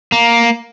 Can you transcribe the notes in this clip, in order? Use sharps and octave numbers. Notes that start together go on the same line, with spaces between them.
A#3